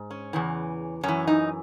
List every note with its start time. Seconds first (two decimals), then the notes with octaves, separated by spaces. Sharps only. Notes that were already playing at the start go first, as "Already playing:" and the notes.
Already playing: G#2
0.11 C#4
0.33 E2 C#3 E3
1.03 F#2 E3 C#4
1.27 D#4